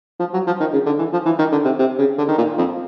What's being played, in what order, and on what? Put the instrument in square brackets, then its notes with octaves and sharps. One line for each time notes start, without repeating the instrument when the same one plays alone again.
[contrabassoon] F3
F#3
F3
D#3
C#3
D3
E3
F3
E3
D#3
D3
C3
C3
C#3
D3
D#3
A#2
F2